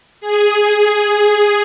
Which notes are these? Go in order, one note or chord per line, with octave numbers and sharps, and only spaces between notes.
G#4